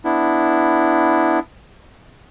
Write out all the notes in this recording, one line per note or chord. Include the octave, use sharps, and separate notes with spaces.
B3 D4 E4